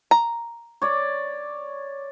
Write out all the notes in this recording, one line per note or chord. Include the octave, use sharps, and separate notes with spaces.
A#5
C#5 D5